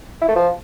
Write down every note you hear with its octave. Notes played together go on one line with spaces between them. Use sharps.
E4
A3
F3